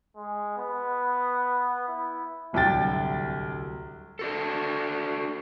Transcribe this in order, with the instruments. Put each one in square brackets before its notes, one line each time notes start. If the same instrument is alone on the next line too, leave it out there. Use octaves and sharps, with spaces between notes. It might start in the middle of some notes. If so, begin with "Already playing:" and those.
[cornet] G#3
B3
E4
[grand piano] D1 C2 F#3 G5 A6
[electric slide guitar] D4 F#4 A4